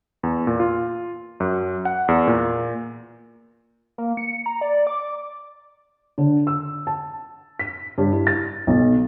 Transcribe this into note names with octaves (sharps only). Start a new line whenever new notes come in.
E2
A#2
F4
F#2
F#5
E2
A#2
A#3
C#7
A#5
D5
D6
D3
E6
A5
B6
G2
E4
A6
B1